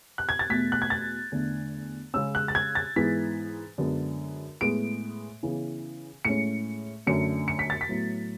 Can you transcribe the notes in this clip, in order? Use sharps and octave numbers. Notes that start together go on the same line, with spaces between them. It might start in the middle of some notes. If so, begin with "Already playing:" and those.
F#6
G#6
A6
E2 B2 A3 B6
F#6
G#6
A6
E2 D3 A3
C#3 G#3 C#4 E6
F#6
A6
G#6
A6
G#2 E3 G#3 B3 B6
F#2 D3 G#3 B3
A2 G#3 B3 D7
C#3 E3 B3
A2 G#3 C#4 C#7
F#2 D3 A3 C#4 C#7
C#7
B6
A6
B6
A2 F#3 B3